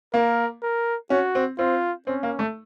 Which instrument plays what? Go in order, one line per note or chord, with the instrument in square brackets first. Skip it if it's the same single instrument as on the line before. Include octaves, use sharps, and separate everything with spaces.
[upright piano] A#3 [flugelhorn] A#4
[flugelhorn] A#4
[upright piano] C#4 [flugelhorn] F#4
[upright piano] C4
[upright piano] C4 [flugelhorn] F4
[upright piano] C4 [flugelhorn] C#4
[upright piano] A#3
A3